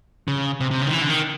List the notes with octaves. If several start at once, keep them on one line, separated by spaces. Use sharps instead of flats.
C#3
C3
C3
C#3
D#3
E3
D3
D#3